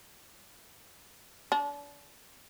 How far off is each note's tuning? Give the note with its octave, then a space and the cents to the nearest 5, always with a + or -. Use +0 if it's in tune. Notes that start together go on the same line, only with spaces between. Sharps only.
D4 -35